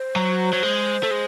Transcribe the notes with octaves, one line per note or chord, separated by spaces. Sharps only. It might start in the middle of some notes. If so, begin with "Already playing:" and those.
Already playing: C5
F#3
F#3
G#3
A3
G#3